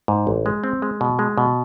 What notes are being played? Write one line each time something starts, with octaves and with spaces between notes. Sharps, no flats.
G#2
A1
G#3
C4
G#3
B2
G#3
B2